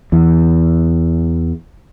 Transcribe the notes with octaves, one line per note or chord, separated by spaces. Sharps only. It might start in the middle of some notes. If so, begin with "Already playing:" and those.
E2 E3